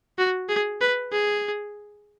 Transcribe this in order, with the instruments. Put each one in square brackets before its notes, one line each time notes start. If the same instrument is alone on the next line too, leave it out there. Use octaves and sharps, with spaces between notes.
[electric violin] F#4
G#4
B4
G#4